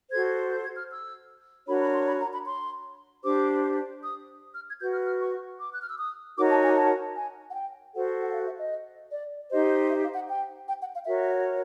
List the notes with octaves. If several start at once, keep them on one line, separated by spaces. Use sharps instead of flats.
F#4 A4 C5 G#6
G6
G#6
F6
E6
D4 F#4 A#4 C#5 B5
B5
C6
B5
A#5
B5
C6
D4 G4 C5 D6
D#6
F6
G#6
F#4 B4 G6
F6
F6
C#6
D6
F#6
F6
E6
D#6
D#4 F#4 A#4 C#5 D6
A5
G#5
A5
G#5
F#5
G5
F#4 A4 C5 F#5
F#5
F5
E5
D#5
D5
D#4 G4 C5 D#5
E5
F5
F#5
G5
G5
F#5
F5
F#4 A#4 C#5 E5